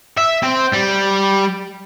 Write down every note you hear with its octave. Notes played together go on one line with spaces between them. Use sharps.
E5
C4
G3